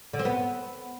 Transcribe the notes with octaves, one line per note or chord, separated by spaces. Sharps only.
D3
C4
B3